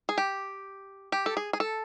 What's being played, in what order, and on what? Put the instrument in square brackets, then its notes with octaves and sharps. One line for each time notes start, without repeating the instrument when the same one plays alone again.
[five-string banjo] G#4
G4
G4
A4
G#4
G#4
A4